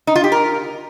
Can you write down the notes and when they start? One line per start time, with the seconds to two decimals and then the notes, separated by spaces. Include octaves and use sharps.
0.07 D#4
0.16 F4
0.24 G4
0.32 A#4